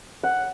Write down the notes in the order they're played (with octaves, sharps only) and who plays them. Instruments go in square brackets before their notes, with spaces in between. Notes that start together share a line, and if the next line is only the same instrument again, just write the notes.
[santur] F#5